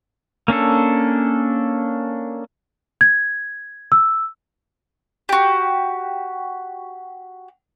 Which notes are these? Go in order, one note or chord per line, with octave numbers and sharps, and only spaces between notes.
A#3 C#4 D4 A4
G#6
E6
F#4 G4